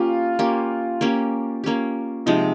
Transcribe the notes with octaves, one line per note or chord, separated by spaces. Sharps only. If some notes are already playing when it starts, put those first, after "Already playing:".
Already playing: A#3 C#4 F4 G4
A#3 C#4 G4
A#3 C#4 G4
A#3 C#4 G4
C3 F3 G#3 D#4